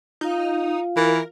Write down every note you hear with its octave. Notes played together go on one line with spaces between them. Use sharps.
D#4 F4 F5
E3 A#4